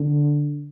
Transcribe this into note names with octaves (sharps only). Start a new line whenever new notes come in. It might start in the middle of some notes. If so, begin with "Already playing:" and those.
Already playing: D3